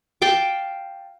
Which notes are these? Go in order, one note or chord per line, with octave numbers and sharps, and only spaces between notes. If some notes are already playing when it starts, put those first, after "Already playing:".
F5 G5 A5 D6